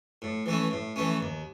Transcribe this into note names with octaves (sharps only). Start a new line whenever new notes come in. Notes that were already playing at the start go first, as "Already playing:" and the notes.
A2
E3 A3 C#4
A2
E3 A3 C#4
D#2